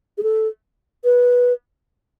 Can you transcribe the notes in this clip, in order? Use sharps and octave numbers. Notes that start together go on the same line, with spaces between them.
G#4
A4
B4